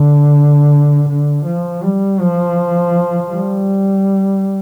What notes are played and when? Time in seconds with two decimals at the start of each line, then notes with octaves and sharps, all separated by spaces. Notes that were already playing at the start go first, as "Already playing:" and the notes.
Already playing: D3
1.08 D3
1.46 F3
1.83 G3
2.20 F3
3.31 G3